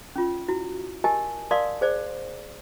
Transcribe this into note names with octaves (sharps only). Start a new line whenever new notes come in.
C#4 F4
E4 F#4
G4 A#4 D#5 G#5 A5
A#4 D5 F5 A5 C6 D#6
G#4 C5 D5